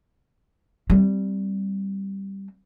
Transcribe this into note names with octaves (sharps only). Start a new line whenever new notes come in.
G3 C4